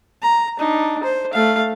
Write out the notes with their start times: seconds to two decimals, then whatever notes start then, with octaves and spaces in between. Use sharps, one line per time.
0.22 A#5
0.59 D4 D#4
1.03 C5
1.33 A3 F5